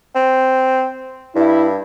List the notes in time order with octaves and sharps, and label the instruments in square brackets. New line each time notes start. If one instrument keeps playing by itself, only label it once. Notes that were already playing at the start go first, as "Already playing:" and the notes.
[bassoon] C4
[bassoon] G2 [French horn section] E4